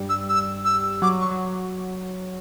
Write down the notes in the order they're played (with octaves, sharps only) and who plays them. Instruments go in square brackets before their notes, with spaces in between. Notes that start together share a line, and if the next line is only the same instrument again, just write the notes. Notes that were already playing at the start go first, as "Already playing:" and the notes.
Already playing: [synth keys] G2 G3
[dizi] E6
E6
E6
[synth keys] F#3 [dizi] D6
[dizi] C#6
[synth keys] F#3